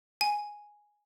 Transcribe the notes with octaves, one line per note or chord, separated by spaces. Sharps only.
G#5